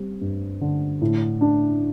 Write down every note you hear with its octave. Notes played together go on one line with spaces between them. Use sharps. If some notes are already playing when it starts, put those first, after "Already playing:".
Already playing: G3 C4
G2
D3
A2
D4